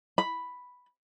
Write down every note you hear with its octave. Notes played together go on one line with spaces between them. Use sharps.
B5